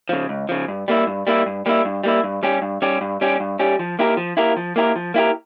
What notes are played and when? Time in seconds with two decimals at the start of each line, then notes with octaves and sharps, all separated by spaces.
0.09 C#3 F3
0.29 C#2
0.49 C#3 F3
0.68 G2
0.88 G3 A#3 E4
1.07 G2
1.27 G3 A#3 E4
1.46 G2
1.66 G3 A#3 E4
1.85 G2
2.03 G3 A#3 E4
2.24 G2
2.43 G3 C#4 G4
2.62 G2
2.82 G3 C#4 G4
3.01 G2
3.21 G3 C#4 G4
3.40 G2
3.59 G3 C#4 G4
3.79 F3
3.99 A#3 E4 G4 A#4
4.17 F3
4.37 A#3 E4 G4 A#4
4.57 F3
4.76 A#3 E4 G4 A#4
4.96 F3
5.14 A#3 E4 G4 A#4